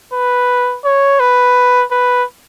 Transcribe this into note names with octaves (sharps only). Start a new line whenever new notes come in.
B4
C#5
B4
B4